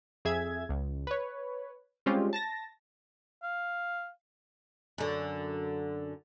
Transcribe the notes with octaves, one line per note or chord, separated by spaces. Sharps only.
F2 G#4 E5 G#6
C#2
B4 C#5
G3 G#3 C4 C#4 F4 G4
A5 A6 A#6
F5
F#2 D3